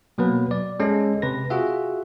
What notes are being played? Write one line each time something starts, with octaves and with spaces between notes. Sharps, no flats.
B2 F#3 A#3 B3 B4
D5
G#3 C#4 A4
C3 B4 A#6
F4 F#4 G#4 E5 F#5